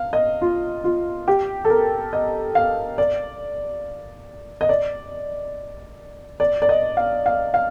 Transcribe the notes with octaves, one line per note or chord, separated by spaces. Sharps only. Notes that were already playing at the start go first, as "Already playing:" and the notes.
Already playing: F5
D#5
F4
F4
G4
A4
A#4
D#5
F5
D5
D#5
D5
D5
D5
D#5
F5
F5
F5